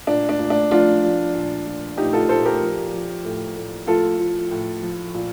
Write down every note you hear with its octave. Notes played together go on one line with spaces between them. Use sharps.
A#2 D4
D4
A#2
D4
F3 D4 F4
F3
A#2
A#2
A#2 D#4 G4
F4 A4
A#2 A4 C5
G4 A#4
F3
F3
A2
A2
F3 F4 A4
F3
A2
F3
A#2